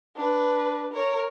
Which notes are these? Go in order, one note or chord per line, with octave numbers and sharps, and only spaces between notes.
D4 B4
A#4 C#5